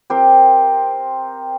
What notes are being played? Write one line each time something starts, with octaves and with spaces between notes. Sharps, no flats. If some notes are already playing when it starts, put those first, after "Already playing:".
C4 G4 A#4 C5